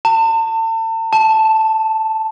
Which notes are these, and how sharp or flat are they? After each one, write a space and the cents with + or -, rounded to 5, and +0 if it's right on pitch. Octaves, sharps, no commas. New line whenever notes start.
A5 +40
A5 +0